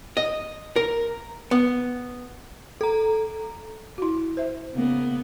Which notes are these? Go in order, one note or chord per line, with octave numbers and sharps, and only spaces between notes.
D#5
A#4
B3
A4 A#5
E4 F#4
C5 E5
C#3 A#3 B3